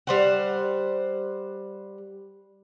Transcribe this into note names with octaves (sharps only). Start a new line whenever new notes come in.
G3 C5 F#5